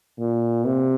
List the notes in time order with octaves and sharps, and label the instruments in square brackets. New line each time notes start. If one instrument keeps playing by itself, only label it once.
[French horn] A#2
C3